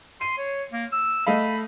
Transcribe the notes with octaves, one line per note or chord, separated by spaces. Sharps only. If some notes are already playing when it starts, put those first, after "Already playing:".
C6 D#7
C#5
A#3
E6
A3 D#5 F5 B5